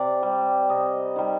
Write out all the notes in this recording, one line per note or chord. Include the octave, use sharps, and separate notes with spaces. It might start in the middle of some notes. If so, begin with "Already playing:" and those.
Already playing: C3 D5
G3
C3 D#5
D#3 G3